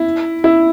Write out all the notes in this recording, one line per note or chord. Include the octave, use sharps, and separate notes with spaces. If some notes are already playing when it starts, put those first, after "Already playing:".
Already playing: E4
E4